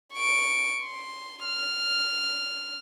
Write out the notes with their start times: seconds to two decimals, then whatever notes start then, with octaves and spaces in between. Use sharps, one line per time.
0.14 C#6 D7
0.83 C6
1.44 F6